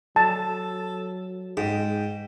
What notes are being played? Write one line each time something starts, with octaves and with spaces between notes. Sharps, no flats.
F#3 A4 A5
G#2 G#4 G5